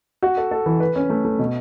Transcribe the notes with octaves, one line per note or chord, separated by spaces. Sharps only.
F#4
A4
A4
E3
B4
C#4
A3
A3
B2